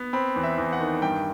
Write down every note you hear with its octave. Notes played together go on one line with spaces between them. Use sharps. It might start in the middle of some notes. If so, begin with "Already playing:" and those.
Already playing: B3
C4 B5
E2
E5
E2
F#5
D#3
G2 G5